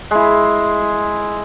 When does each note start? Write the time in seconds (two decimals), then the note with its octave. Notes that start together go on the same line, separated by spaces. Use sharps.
0.11 G#3 E4